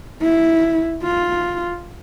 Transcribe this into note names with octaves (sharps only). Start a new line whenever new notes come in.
E4
F4